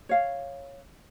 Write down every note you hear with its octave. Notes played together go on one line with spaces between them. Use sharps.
C#5 F5